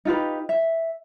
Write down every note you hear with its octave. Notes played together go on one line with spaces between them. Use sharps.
D#4 F4 G4 B4
E5